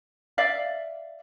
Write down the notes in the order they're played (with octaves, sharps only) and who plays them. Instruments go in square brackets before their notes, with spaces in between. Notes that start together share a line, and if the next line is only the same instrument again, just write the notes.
[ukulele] D5 E5 F5